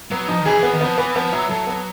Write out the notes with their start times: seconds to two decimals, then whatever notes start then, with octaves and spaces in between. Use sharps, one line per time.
0.11 F#3 B3
0.28 F3 D#4
0.41 D#3
0.46 E3 G#4
0.59 E3 B3
0.73 D#3
0.81 F3 B3
0.98 E3 B3
1.15 F3 B3
1.32 F#3 E4
1.49 F#3 A4
1.67 B3